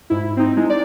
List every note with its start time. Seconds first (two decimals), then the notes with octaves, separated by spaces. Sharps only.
0.10 G#2 E4
0.37 C4 D#4
0.57 G#3 E4
0.70 D5